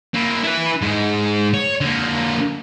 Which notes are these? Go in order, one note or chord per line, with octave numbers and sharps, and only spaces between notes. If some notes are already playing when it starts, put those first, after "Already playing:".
A#3 E4
E4 B4
G#2 G#3
C#5
D3 A#3